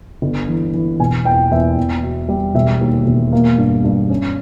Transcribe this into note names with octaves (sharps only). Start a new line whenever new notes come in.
G1
E3
E3
E1 G#5
E2 G5
E2 E5
E2
B2
G3
E1 E5
D#2
E1
A#3
G2
G2
C#4